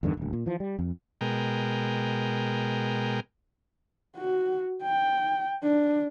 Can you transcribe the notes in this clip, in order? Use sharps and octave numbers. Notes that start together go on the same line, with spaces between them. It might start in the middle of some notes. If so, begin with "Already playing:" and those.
E2 G2 D3 D#3
D#1 D2
A#2
E3 F3
G3
F2
B2 G#3 A#4 G5
F#4
G5
D4